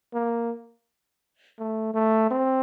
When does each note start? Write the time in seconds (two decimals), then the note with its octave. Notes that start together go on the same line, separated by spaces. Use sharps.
0.14 A#3
1.59 A3
1.94 A3
2.31 C4